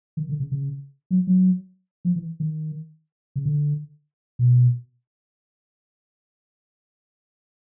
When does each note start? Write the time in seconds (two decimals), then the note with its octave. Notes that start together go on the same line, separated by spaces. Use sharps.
0.17 D#3
0.29 D3
0.40 C#3
0.52 C#3
1.11 F#3
1.27 F#3
2.05 F3
2.16 E3
2.40 D#3
3.36 C#3
3.46 D3
4.39 B2